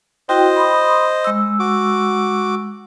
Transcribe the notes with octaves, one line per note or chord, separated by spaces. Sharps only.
E4 F#4 C5 D#5 G5
B5 C6 D#6
G#3 E6
F#4 D6